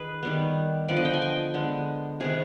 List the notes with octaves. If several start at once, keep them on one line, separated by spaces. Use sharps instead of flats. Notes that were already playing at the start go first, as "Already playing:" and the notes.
Already playing: D#3 G#4 B4
D#3 G3 B3
D3 F3 B3 D5
D#5
G5
G#5
G5
D3 G#3 B3
C3 D#3 B3 G#4